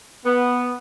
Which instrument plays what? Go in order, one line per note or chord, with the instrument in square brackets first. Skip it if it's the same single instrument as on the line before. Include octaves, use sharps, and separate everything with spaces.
[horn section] B3